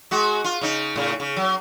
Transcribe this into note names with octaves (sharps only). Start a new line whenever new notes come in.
G#3 F#4
F4
C#3 D#4
A2 C#3
C#3
F#3